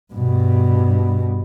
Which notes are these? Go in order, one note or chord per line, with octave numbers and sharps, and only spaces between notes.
G2 B2